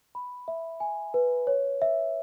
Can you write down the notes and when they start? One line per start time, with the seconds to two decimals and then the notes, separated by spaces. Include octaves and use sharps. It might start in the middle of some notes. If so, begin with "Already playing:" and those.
0.15 B5
0.48 E5
0.80 G#5
1.14 B4
1.47 C#5
1.82 E5